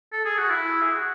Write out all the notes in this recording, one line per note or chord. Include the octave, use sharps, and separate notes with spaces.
A4
G#4
F#4
E4
G#4
F#4